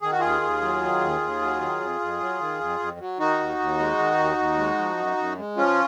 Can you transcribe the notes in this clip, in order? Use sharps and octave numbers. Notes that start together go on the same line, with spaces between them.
D#3 G#4
F#4
D#2 F4 G#4
D#2
F#3
D#3
D#2
D#2
F#3
D#3
F2
F2
F#3
D#3
F2
F2
F#3
D#3 D#4 F#4
D#2
D#2
G#3
D#3
D#2
D#2
G#3
F3
F#2
F#2
G#3
F3 C#4 F4